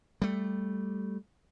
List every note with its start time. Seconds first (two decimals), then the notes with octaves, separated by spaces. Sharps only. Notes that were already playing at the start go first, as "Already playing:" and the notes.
0.22 G3 A3